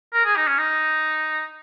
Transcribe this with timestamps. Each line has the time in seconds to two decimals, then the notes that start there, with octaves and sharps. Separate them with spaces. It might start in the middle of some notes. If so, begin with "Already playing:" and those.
0.13 A#4
0.25 G#4
0.36 D#4
0.47 C#4
0.58 D#4